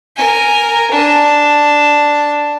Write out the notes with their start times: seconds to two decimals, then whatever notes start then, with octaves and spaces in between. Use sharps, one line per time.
0.16 A#4 G#5
0.91 D4